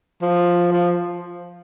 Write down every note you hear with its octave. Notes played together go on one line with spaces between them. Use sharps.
F3
F3